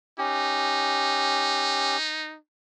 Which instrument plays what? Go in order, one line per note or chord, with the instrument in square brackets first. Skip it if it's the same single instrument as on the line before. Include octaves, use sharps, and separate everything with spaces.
[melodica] C#4 G4 [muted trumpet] D#4